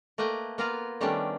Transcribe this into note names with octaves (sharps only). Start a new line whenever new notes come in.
A3 A#3 B4 D#5 G5
A#3 B3 F4 A#4 B4 F5
D#3 G3 A3 B3 C#4 D4